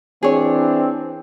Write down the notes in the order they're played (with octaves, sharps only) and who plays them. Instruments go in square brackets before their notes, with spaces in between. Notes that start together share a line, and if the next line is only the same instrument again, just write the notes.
[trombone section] E3 C4 D4 [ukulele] G#4 C#5